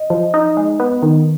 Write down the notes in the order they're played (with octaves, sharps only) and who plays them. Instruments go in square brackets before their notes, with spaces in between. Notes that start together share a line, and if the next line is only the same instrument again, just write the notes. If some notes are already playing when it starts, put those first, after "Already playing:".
Already playing: [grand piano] D#5
[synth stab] F3
D#4
G#3
B3
D#3